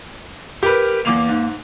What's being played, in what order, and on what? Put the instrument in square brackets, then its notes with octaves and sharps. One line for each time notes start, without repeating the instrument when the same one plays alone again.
[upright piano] G4 B4 [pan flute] A#4
[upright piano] E2 D6 F7 [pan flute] A#3
[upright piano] G#2